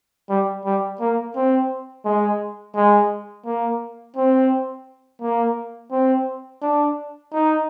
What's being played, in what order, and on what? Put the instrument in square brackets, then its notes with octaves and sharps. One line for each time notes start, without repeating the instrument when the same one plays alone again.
[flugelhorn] G3
G3
A#3
C4
G#3
G#3
A#3
C4
A#3
C4
D4
D#4